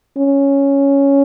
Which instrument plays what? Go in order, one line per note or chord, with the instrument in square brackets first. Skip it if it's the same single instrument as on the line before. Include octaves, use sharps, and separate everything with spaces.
[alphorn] C#4